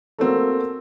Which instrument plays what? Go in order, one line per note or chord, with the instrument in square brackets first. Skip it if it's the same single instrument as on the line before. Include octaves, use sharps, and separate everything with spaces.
[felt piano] A3 A#3 C4 F#4